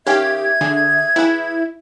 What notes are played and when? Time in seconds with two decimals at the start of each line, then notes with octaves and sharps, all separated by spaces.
0.07 D#3 C#4 G4 E5 F5 G#6
0.61 D3 G#4
1.16 E3 E4 G#4 B4